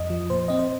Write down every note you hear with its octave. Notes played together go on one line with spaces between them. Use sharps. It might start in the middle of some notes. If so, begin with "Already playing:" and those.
Already playing: F2 D#5
F3
A#2 C5
C4 D#5
C5